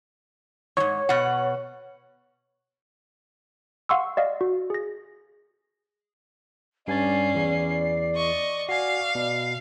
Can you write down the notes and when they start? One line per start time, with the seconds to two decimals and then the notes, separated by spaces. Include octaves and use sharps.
0.77 E2 G#2 C#5
1.09 B2 F#5
3.89 F5 F#5 C6 C#6 E6
4.17 D5 D#5 F5
4.41 F#4
4.70 G#4 A#6
6.88 G2 C#4 D5 G#5 A6 C7
7.35 E2 E3
8.15 D#5 C#6
8.69 F#4 F5 G#5 C7
9.15 B2